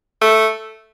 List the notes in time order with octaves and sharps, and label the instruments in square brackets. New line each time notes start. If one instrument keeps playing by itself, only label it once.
[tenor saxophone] A3